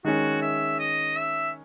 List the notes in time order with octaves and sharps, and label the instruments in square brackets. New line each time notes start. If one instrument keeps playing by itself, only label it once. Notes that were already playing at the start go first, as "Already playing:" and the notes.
[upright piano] D#3 G#3 C#4 [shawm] F#4
[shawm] E5
D#5
E5